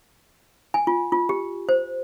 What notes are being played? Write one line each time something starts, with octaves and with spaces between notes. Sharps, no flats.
G#5
F4
F4
G4
C5